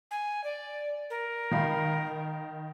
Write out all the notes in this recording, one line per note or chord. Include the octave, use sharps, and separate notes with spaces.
G#5
D5
A#4
D#3 F5 B5